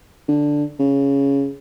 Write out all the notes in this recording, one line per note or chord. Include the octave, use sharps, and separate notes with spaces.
D3
C#3